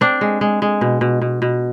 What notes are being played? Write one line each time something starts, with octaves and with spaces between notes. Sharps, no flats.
C4 D4
G#3
G#3
G#3
B2
B2
B2
B2